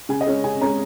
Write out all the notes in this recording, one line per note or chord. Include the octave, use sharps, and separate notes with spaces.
C#3 G#5
D#5
G#3 C#4
C#3 G#5
G#3 C#4 A#5